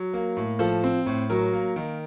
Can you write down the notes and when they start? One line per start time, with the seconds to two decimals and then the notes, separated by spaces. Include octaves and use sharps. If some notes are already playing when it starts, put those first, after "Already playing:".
Already playing: F#3
0.14 A#3
0.37 A2
0.59 F3 A4
0.84 C4
1.06 A2
1.30 F#3 A#4
1.53 A#3
1.76 D#3